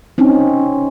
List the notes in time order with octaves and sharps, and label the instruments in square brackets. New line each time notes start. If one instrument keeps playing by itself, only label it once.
[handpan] C4 C#4 D#4